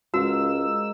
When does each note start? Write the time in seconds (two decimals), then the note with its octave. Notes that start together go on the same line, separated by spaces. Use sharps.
0.14 C#2 G#2 F#4 A#4 F5 E6